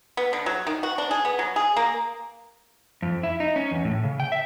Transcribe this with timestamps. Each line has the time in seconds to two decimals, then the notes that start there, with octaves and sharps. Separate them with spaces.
0.17 B3
0.33 D3
0.46 F#3
0.67 D#3
0.83 F#4
0.98 D4
1.11 G#4
1.25 B3
1.39 F#3
1.56 G#4
1.77 A#3
3.02 F2
3.23 E4
3.40 D#4
3.56 C#4
3.71 E2
3.85 A2
4.04 C#3
4.20 G5
4.32 E5